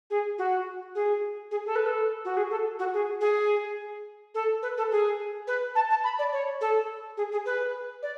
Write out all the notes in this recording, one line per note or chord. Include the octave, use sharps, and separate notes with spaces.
G#4
F#4
G#4
G#4
A4
B4
A4
F#4
G#4
A4
F#4
G#4
G#4
A4
B4
A4
G#4
B4
A5
A5
B5
D5
C#5
A4
G#4
G#4
B4
D5